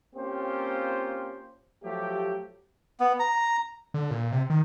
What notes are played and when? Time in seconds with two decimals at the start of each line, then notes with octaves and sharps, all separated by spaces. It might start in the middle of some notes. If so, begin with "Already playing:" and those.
0.16 A#3 C4 C#4 F4 G4 C5
1.83 F3 F#3 A3 G4
3.00 B3
3.19 A#5
3.94 D3
4.11 A#2
4.32 C3
4.50 D#3